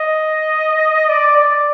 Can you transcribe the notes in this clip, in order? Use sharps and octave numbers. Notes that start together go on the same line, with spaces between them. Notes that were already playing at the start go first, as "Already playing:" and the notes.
Already playing: D#5
D5
D5